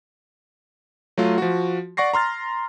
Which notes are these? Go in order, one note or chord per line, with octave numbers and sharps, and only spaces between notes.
F#3 A3 F4
F3 F#4
D5 F#5 C#6 A#6 C7
A#5 C6 F6 A6